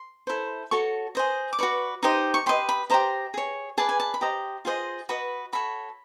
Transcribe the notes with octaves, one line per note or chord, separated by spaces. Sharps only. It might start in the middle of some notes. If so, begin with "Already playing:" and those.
Already playing: C6
E4 A4 C5
F#4 A4 C#5 C#6
G#4 C5 D#5
D6
F#4 B4 D5 C#6
D#4 G4 C5 D#5
C#6
G4 B4 D#5 C6
B5
G4 C5 D#5 A#5
G#4 C#5
G#4 B4 D5 A5
G#5
A5
B5
G4 C5 D#5 A#5
F4 G#4 C5 D#5
F#4 B4 D#5 B5
F#4 A4 C#5 B5